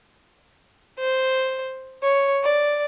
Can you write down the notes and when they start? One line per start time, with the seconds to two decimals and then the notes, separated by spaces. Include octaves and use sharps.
0.99 C5
2.02 C#5
2.44 D5